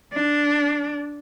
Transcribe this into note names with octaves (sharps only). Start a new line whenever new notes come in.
D4